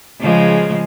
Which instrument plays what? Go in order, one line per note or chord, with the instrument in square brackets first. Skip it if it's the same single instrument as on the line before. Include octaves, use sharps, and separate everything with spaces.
[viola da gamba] C#3 F3 G#3